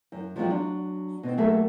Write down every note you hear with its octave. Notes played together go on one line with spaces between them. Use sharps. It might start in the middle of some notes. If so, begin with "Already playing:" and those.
F#2
F3 F#3 G#3 C4 F4
F#3 D4
B2 C4
F#3 A3 A#3 G#4 A4 E5